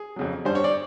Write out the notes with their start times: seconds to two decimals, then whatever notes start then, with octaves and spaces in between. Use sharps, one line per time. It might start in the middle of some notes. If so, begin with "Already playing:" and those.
Already playing: G#4
0.16 F2 C#3 F#3
0.45 G2 D3 G3 C5
0.55 C#5
0.64 D5